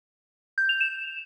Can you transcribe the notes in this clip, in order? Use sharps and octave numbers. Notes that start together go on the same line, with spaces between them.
G6
F7
E7